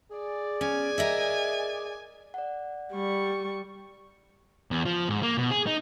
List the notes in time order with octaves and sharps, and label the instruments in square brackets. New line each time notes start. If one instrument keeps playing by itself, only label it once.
[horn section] G#4 D5
[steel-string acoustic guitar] C#4 [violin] G#5
[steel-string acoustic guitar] A#4 D#5 E5
[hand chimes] D5 F#5
[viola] G3 C#6
[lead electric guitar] E2
F3
G#2
A#3
B2
G#4
D#4